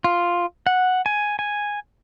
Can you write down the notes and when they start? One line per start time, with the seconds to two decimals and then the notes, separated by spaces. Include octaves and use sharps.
0.04 F4
0.67 F#5
1.06 G#5
1.39 G#5